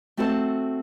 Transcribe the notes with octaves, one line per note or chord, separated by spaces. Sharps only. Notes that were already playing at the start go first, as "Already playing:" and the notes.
A3 C4 F#4 A4 C5 A5